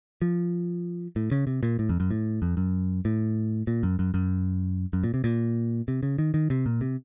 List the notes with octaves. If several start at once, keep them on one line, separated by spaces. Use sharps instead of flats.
F3
A2
C#3
C3
A#2
A2
F2
F#2
A2
F2
F#2
A2
A#2
F#2
F#2
F#2
F#2
A#2
C3
A#2
C3
C#3
D#3
D#3
C3
A#2
C3